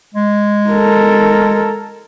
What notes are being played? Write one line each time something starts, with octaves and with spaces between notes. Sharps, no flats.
G#3
A4 A#4